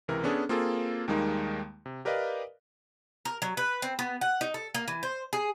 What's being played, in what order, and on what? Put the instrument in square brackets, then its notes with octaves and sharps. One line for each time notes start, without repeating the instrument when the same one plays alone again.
[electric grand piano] C#2 C3 E3 A#4
B3 C#4 D4 G#4 A4
A#3 C4 F4 G#4 A4
D#2 D#3 G3 G#3 A#3 D#4
C3
G4 A#4 B4 D5 D#5 F5
[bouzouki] A#4
F#3
B4
C4
B3
F#5
D#4
A4
A#3
E3
C5
G#4